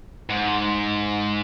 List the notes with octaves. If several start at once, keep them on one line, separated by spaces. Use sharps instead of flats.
G#2